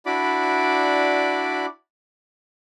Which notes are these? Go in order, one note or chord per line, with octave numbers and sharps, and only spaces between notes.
D4 E4 F#4 D5 B5 D6